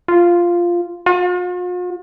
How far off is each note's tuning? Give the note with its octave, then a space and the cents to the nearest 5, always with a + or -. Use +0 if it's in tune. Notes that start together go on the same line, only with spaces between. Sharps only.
F4 -5
F4 +45